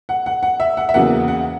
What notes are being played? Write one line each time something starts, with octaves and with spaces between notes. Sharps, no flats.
F#5
F#5
F#5
E5
F#5
E5
E2 C#3 F#3 A#3 F#5
F#5